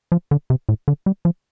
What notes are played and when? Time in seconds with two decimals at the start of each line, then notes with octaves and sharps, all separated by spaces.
0.12 F3
0.31 D3
0.50 C3
0.69 A2
0.88 D3
1.06 G3
1.25 F3